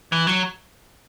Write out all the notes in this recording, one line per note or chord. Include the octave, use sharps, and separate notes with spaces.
E3
F#3